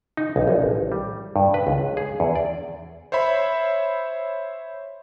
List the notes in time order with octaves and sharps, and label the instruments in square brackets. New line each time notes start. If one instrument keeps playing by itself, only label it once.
[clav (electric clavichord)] D#4
B1
A#1
A1
G3
G2
B4
C#2
G#4
E2
D5
[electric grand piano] C5 C#5 E5 B5